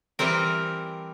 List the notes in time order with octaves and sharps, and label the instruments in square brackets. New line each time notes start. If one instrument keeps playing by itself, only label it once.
[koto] E3 G3 C4 A#4